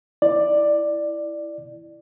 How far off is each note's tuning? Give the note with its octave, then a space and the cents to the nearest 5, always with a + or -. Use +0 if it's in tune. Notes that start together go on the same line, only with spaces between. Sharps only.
E4 +0 D5 +10